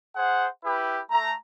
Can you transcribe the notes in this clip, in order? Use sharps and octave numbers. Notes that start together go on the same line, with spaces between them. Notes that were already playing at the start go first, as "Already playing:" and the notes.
G#4 C5 F#5
E4 G4 B4
A3 A#5